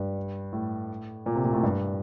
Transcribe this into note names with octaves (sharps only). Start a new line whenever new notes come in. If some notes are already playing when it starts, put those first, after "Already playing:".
Already playing: G2
A2
A#2
C3
A#2
A2
G2